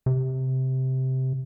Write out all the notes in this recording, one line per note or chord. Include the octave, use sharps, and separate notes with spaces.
C3